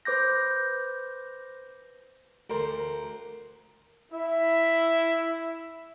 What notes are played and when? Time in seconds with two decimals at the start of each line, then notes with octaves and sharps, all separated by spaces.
0.05 B4 C5 D6 G6 A#6
2.50 D2 A#4 C5
4.12 E4 E5